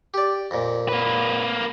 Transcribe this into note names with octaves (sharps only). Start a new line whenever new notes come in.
G4 D5
F2 A#2
A#3 B4